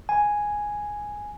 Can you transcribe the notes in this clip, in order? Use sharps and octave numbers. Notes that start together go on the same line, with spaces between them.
G#5